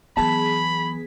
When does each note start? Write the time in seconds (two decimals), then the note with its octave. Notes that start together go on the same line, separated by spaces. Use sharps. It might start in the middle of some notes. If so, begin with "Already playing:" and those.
0.17 E3 F#3 B3 G#4 A5 B5 B6